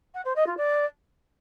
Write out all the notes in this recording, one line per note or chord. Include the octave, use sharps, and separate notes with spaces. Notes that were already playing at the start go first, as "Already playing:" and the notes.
F#5
C5
D#5
F4
D5